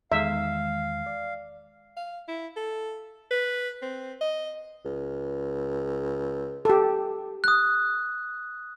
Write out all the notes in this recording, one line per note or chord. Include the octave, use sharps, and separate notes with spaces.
E2 D#3 G#3 E5 F5
D5
F5
E4
A4
B4
C4
D#5
C#2
G4 A4
D#6 F#6